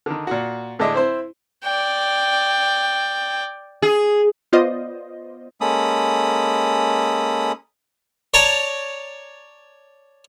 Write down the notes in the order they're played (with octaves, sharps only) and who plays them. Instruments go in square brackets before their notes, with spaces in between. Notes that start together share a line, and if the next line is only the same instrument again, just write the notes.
[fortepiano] D3 D#3
A#2 F#4
A2 D3 G#3 D4 D#5 E5
C4 E4 C5
[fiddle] D5 G5
[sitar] G#4
[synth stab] B3 F4 C5 D5 D#5
[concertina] G#3 A#3 C#4 A4 B5 D#6
[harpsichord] C#5 D5 A5 A#5 C#6